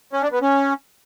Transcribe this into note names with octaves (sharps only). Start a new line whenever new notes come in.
C#4
D4
B3
C#4